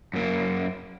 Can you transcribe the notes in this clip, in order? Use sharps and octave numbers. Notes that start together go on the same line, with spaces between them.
F#2 A#3